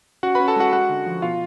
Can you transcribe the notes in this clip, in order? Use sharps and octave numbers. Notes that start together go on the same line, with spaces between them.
C#4 F#4 F#5
C#4 B4 B5
A4 A5
G#3 F#4 F#5
G#3 F#4 F#5
D3
F3
B2 F4 F5